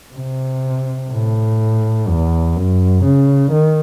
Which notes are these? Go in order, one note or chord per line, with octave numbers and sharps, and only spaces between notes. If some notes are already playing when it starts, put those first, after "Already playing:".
C3
A2
E2
F#2
C#3
D#3